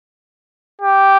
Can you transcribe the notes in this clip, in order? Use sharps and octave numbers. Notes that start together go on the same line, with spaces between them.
G4